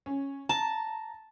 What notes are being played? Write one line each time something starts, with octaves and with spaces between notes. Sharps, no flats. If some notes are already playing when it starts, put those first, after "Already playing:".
C#4
A5 A#5